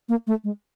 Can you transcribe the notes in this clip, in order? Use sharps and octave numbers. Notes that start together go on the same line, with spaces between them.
A#3
A3
G#3